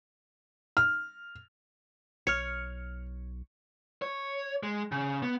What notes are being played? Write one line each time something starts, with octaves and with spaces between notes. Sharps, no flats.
F6
B1 C#5 F6 C#7
C#5
G#3
C#3
B3